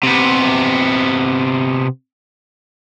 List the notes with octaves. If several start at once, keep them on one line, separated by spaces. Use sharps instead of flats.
C3 B3